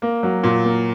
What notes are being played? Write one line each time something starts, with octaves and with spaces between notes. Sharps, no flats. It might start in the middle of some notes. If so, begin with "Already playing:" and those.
A#3
F#3
A#2
A#3